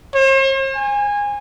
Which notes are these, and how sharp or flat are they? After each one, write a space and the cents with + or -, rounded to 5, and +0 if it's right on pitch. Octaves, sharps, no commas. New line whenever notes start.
C5 +45
G#5 -20